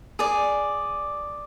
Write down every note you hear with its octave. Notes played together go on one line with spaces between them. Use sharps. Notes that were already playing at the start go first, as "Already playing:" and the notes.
G#4 D5